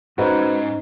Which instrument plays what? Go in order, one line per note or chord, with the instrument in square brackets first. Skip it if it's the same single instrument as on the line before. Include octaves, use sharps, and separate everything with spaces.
[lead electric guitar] G#2 [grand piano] C#4 D#4 C5 [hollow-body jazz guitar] F#4 B4